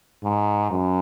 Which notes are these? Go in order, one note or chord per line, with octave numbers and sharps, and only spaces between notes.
G#2
F#2